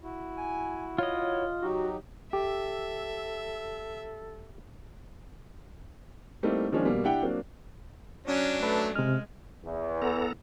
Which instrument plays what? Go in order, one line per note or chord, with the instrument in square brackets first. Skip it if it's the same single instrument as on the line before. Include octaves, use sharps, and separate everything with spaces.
[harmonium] E4 F#4
[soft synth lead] G#5
[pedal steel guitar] F4 D#5 [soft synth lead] C#5
[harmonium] F#3 D#4 G4 [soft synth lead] F#4
[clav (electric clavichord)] G4 [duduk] A4 [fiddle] E5
[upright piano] G3 A3 A#3 C4 D#4 E4
D#3 F3 G#3 A#3 C#4 D4
B2 G3 A#3
D4 E4 G4 F#5 G5
F#3 A#3 C4 D4
[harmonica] F#3 D4 [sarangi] C#4
[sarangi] A3 [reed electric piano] B4 A5
[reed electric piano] C3 F6 [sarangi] G#3
[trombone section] E2
[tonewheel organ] B3 A4 A#5